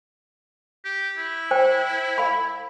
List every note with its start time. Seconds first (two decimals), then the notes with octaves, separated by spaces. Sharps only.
0.85 G4
1.18 E4
1.51 C5 G5
2.18 F5 B5